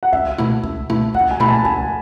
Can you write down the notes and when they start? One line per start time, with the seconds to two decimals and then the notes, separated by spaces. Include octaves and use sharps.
0.03 F#5
0.13 C#2 E5
0.38 B2 A3 E4
0.64 C#2
0.90 B2 A3 E4
1.14 C#2 F#5
1.31 G#5
1.40 B2 A3 E4 B5
1.48 A5
1.65 C#2 G#5